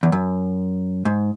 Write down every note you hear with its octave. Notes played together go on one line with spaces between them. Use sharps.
E2
F#2
G#2